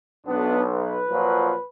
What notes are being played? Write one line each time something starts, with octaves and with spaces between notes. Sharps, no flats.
B1 B3 D4
B4
A#2 F3 F#3